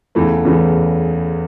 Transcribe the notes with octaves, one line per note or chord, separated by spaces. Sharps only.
E2 C#3 E3 A3
E2 C#3 E3 A3